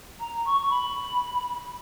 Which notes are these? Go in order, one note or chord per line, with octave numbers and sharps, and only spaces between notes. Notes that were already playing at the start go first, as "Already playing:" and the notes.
A#5
C#6
B5